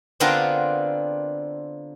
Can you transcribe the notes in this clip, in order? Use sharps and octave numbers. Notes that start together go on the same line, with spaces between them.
D3 B3 C4 D4 F4 A#4